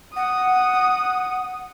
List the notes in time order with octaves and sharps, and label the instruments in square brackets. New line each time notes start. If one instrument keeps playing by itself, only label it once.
[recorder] F#5 [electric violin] D#6